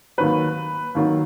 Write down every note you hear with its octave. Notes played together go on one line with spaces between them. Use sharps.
D#2 D#3 F#3 B4
D#2 D#3 F#3